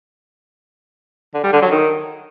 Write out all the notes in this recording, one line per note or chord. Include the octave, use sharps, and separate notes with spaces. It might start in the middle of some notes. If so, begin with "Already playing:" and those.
D3
G3
D3
F#3
D#3